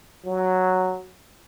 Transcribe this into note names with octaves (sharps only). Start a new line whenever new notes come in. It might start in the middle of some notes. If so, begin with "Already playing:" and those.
F#3